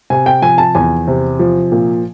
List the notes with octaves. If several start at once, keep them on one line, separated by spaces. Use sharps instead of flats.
C3 G#5
G5
F3 G#5
A5
E2 G#5
C3
F3
A#2